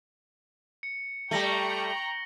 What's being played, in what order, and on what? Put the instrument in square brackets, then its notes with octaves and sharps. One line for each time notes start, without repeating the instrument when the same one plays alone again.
[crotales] C#7
[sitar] G3 A3 [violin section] G5 A#5 C#6 [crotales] A#6 F#7 G7